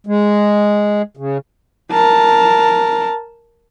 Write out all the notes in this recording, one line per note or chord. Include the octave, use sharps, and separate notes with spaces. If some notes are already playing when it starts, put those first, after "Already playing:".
G#3
C#3
A#4 A5